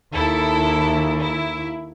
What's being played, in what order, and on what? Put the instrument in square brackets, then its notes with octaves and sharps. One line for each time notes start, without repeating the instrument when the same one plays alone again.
[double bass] D#2 [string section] E4 A4
[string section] E4